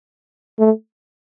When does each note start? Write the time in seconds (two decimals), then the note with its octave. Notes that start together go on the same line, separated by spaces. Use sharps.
0.59 A3